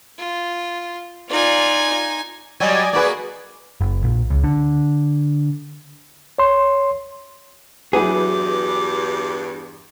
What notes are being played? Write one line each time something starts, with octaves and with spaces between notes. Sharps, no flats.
F4
D#4 F4 D5 G#5
F#3 G3 D5 D#5 G#5
A#3 F#4 G#4 B4 D5
F#1
A#1
C#2
D3
C#5 C6
E2 G2 F#3 E4 G#4 B4 D6